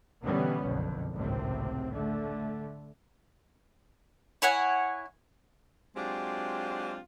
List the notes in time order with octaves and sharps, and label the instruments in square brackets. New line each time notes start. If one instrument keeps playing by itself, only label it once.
[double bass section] B2 D3 E3 G3 B3 C#4
F#1 B1 F2 D3
G#1 C#2 A2 C3 C4
D3 A3
[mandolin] E4 C#5 F#5 G#5
[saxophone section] F#3 G#3 C4 D4 F4 G4